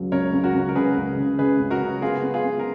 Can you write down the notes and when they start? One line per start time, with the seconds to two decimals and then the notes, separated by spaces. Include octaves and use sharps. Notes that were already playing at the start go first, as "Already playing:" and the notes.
Already playing: C#2 C#3 F#3
0.12 C#2 A#4 C#5
0.33 C#2
0.44 F#4 A#4
0.54 C#2
0.69 A#4
0.75 C#3 G#4 B4
0.96 C#2
1.17 C#3
1.39 C#3 G#4 B4
1.60 C#2
1.70 F#4 A#4
1.81 C#3
2.02 B3 F4 G#4
2.23 B3
2.34 F4 G#4
2.44 B3
2.59 A#4